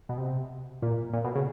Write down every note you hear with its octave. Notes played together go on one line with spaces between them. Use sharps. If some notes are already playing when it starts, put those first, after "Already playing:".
B2
C3
A#2
A#2
B2
C#3